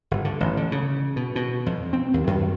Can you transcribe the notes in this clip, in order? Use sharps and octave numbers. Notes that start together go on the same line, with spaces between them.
G1
D3
A1
D3
C#3
B2
B2
F2
C4
D#2
F#2